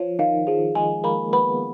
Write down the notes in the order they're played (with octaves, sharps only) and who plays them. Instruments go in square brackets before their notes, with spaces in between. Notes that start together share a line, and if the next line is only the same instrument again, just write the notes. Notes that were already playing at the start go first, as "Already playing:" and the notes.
Already playing: [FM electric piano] F3 [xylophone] C#5
[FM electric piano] D#3 [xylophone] F5
[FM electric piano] F3 [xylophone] G#4
[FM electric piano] G#3 [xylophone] G#5
[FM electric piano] A#3 [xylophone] B5
[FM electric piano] B3 [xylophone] B5